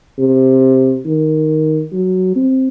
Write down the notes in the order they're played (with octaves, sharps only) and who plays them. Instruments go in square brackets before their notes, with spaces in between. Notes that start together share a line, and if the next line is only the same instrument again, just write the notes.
[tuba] C3
D#3
F#3
C4